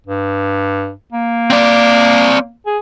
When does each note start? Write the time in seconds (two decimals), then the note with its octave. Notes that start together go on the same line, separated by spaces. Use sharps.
0.07 G2
1.13 A#3
1.50 C4 D5
2.66 G#4